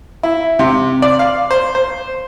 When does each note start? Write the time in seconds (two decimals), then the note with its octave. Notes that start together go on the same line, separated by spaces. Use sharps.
0.23 E4
0.59 C3
1.02 D5
1.19 F5
1.51 C5
1.75 C5